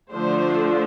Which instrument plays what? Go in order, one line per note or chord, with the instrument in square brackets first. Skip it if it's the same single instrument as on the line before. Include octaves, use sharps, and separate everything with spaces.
[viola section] D3 F3 A3 D4 C5